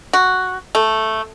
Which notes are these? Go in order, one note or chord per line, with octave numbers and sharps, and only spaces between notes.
F#4
A3